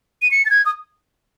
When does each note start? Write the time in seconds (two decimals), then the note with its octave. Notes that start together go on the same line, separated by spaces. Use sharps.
0.22 D#7
0.31 C#7
0.45 A6
0.50 G#6
0.65 D#6